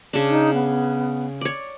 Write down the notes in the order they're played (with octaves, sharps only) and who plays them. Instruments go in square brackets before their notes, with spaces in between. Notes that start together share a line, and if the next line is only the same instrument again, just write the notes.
[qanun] C#3 D4
[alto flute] D#4
B3
[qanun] C#5 D5